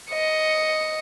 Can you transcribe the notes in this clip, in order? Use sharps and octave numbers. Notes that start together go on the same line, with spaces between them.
D#5 C#7